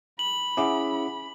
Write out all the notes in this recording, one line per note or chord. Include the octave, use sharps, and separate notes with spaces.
B5 F#7
C#4 E4 G#4 E5 F#5 D6